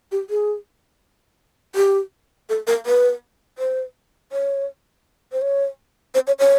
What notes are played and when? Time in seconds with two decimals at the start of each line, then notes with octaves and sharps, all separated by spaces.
0.12 G4
0.30 G#4
1.75 G4
2.49 A4
2.67 A#4
2.86 B4
3.58 C5
4.32 C#5
5.32 C5
5.42 C#5
6.14 C5
6.27 C#5
6.39 C#5